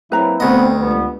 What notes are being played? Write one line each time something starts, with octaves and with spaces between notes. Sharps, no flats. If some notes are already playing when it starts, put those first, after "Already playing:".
F#3 A#3 C4 E4 B4 A#5
D2 B3 C4 D#5
C#2 D3 G3 B3